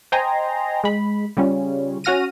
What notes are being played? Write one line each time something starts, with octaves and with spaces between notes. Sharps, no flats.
C5 D#5 G5 G#5 A#5 C6
G#3 B5
C#3 G3 C#4 F4
C#4 F#4 F#5 F6 A#6 D#7